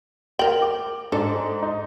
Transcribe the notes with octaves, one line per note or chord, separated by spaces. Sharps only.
A#4 G5 F#7
D6
G#2 D4 A4 C5
D#4